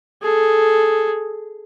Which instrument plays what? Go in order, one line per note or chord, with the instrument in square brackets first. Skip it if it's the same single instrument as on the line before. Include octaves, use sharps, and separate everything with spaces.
[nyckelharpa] G#4 A4